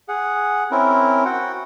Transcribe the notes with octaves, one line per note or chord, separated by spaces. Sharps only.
G#4 F#5
C4 C#4 E4 A#4
F#4 F#5 G5